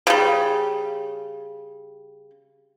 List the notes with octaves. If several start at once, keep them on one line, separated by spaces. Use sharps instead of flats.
C#3 G3